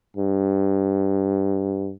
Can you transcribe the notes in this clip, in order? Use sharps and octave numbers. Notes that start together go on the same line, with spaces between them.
G2